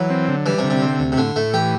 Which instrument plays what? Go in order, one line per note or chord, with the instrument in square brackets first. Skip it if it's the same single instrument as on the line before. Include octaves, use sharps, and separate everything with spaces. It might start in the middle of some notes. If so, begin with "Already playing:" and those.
Already playing: [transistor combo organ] E3 [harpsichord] F#3
[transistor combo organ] C4
D3
[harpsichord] E3 [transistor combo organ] G3
[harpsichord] C3
[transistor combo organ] D3
[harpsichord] C3
[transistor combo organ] C4
D2
[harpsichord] C3
[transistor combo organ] A2 [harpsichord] D3
[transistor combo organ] A2 [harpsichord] A3
[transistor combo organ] E3 [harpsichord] G4